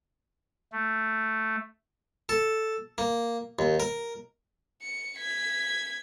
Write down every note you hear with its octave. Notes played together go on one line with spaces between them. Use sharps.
A3
A4
A#3
D#2
A#4
C#7
G#6 B6